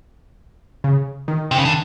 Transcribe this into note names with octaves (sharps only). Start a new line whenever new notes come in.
C#3
D#3
C3
C#3
D3